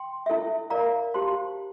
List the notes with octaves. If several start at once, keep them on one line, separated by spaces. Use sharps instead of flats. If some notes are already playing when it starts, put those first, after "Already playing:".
Already playing: G5 C6
E4 A4 E5
A#4 D5 F5 A#5
G4 C5 F5 A5 C6